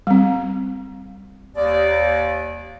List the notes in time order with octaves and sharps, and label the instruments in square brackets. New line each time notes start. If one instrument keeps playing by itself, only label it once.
[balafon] G3 C4
[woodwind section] D#2 D5